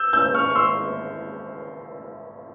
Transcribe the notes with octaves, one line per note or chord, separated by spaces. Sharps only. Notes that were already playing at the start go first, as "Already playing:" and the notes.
Already playing: E6 G6
E6 G6
C#6 F6
C#6
C6 E6